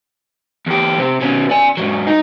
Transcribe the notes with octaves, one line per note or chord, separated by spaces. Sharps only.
E2 G4
C3 C4
B2 C#4
D5 G#5
G#2 F#3
D#4